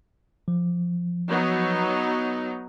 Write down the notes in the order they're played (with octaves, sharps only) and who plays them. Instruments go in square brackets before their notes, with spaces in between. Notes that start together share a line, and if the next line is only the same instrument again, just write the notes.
[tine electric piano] F3
[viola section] F#3 B3 D#4